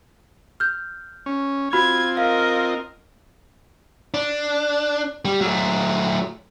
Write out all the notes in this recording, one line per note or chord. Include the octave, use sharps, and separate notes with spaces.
F6 G6
C#4
C4 F4 F#4 B5 G#6
A#4 D#5 F5
D4
G3
F#3 A3